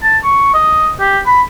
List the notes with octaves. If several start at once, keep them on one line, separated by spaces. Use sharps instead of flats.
A5
C#6
D#5
G4
B5